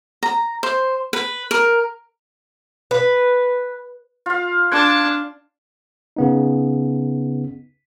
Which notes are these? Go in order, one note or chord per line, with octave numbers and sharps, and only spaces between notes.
A#5
C5
B4
A#4
B4
F4 F5
D4 A5 C6 F#6 G#6
C#3 B3 D#4